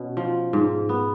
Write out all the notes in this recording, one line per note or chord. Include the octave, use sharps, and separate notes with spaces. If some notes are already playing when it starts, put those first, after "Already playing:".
Already playing: B2 C#4
F3
G#2
B3